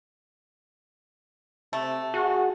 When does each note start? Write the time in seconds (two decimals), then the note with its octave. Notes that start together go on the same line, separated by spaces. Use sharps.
1.73 C3 A3
2.14 F#4 G#4